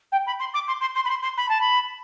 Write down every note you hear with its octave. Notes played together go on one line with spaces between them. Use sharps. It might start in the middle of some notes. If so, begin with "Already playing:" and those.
G5
B5
C6
D6
C6
C6
C6
B5
C6
C6
B5
A5
B5